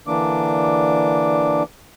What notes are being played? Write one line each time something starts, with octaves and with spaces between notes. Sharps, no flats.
D3 E3 A#3 D4 D6